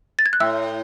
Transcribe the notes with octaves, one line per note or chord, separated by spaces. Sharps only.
A6
G#6
F#6
A2 E5 E6